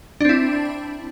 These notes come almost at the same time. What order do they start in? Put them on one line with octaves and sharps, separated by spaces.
D4 C4 E4